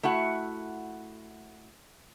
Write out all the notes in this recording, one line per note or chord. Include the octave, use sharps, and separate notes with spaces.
A3 E4 F#4 F#5